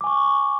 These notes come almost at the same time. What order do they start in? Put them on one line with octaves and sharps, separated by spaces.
D6 G#5 C#6